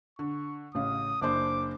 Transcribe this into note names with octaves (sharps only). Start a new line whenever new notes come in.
D3 C#6
A1 C#3 F5 D#6
F#1 D4 C5 D6